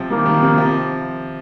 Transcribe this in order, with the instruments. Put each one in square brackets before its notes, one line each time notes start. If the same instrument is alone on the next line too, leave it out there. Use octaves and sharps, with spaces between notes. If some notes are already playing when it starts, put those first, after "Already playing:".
Already playing: [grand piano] C3 F3
[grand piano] D#3 G3 [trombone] A#3
[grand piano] D#3 G3
C3 F3
C3 F3